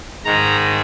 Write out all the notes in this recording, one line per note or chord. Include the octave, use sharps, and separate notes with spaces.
G#2 D#3 G#3 A#5